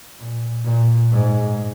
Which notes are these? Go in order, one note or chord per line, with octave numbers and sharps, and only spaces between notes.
A#2
A#2
G#2